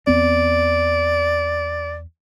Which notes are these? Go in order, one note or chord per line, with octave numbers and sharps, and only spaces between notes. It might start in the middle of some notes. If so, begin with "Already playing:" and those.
E2 B3 C4 D5